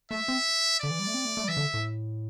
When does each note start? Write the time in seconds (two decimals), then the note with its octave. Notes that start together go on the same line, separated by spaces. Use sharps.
0.11 A3 E5
0.28 C4
0.79 D3 D5
0.91 E3
0.99 G3
1.07 A3
1.14 C4
1.25 A3
1.37 A3
1.44 G3
1.48 E3 E5
1.57 D3
1.74 A2